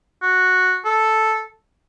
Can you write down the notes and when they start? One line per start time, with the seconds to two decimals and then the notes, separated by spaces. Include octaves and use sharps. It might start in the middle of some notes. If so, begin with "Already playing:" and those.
0.23 F#4
0.85 A4